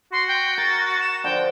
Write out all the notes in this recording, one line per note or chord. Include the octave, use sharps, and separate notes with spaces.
F#4 C6
G5
A#4 A6
E7
D3 F3 G5